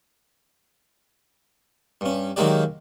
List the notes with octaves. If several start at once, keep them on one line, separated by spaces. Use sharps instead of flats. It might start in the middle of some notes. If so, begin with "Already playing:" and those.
G2 C#4
D#3 F#3 G#3 A#3 G4 D5